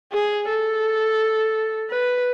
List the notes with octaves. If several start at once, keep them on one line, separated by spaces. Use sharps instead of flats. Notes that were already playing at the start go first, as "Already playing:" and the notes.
G#4
A4
B4